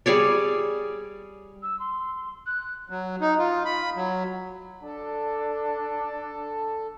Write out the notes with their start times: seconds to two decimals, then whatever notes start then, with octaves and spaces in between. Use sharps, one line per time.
0.06 G3 G#4 C#5 D5
1.63 E6
1.79 C6
2.47 F#6
2.90 F#3
3.21 D#4
3.39 F4
3.65 B5
3.96 F#3
4.83 D4 A4